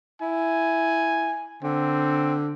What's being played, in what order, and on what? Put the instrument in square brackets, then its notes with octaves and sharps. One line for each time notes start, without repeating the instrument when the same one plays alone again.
[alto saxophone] E4 [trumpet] G#5
[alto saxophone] D3 [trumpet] C4